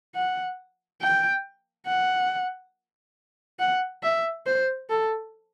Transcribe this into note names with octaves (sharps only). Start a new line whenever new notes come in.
F#5
G5
F#5
F#5
E5
C5
A4